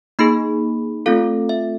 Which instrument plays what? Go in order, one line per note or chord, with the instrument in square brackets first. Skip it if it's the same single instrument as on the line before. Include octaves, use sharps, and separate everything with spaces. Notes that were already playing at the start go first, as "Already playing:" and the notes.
[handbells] A#3 D#4 G#4 B5
A3 C4 F4 A4 F5
E5